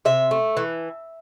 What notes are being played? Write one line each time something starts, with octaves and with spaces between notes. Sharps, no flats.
C3 E5
A3
E3